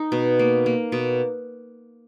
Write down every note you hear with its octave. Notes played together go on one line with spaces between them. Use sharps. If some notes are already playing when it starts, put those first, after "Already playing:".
Already playing: D#4
B2
A#3
A#3
B2